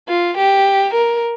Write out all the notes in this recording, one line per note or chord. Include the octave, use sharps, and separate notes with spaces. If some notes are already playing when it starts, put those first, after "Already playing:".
F4
G4
A#4